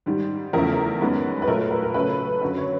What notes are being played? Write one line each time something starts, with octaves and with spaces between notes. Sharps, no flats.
G#2 D#3 G3
E2 C#3 F3 A3 A#4
F#2 D#3 G#3 B3
B4
A#2 F#3 A3 A#4
B4
A#4
C#3 F#3 A3 B4
F#2 D3 F#3 B4
C#5